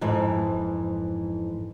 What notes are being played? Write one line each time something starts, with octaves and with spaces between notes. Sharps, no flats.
F2 G#2 E3